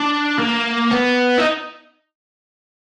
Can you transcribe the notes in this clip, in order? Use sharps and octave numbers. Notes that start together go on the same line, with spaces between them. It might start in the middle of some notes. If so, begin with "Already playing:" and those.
Already playing: D4
A#3
B3
D#4